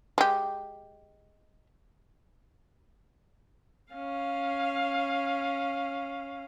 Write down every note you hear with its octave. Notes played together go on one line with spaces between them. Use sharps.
G#3 G4
C#4 F5